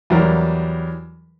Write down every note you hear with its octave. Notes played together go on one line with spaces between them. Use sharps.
E2 F#3 G3 A#4